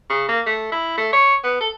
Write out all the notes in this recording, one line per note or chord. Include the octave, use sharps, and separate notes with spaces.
C#3
A#3
A3
E4
A3
C#5
B3
A4